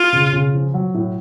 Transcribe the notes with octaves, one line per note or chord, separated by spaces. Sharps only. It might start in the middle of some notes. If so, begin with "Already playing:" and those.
Already playing: F4
C#3
C#3
F3
F#3
A2